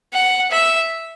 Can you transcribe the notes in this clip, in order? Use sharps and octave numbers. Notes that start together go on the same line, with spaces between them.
F#5
E5